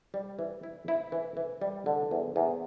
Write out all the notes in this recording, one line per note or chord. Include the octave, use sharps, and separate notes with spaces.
G3
E3
E4
E4
E3
E3
G3
D3
E2
E2